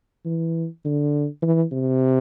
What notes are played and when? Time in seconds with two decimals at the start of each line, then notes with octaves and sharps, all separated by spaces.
0.25 E3
0.84 D3
1.42 E3
1.72 C3